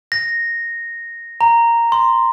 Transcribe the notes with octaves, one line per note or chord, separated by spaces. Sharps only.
A#6
A#5
C6